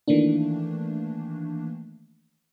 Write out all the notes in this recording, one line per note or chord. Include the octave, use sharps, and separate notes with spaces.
D#3 E3 A3 A#3 D4